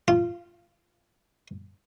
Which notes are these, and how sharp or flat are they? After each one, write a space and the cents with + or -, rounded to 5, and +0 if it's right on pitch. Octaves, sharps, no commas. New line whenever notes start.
F4 -15